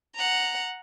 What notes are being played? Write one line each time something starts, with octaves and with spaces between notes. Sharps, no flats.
F#5 A#5